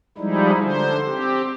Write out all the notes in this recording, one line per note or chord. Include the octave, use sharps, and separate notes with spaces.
F3 G3 G#3 D#4 E4
D3 C5
C4 G4